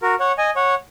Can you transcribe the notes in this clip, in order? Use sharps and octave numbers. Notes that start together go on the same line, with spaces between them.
F#4 A#4
C#5 F#5
D#5 G#5
C#5 F#5